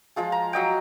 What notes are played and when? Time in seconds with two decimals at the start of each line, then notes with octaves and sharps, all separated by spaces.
0.16 F3 G#3 F4 G#4
0.32 A#5
0.53 F#3 D#5 G5